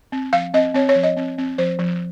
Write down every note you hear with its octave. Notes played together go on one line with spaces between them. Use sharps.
C4
F3 F5
C4 D#5
C4 C#5
C#5
F3
D#5
C4
C4
F3 C5
F3